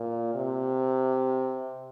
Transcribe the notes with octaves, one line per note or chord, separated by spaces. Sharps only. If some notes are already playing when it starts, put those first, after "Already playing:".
Already playing: A#2
C3